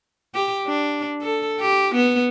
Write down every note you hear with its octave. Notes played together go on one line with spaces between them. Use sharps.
G4
D4
A4
G4
B3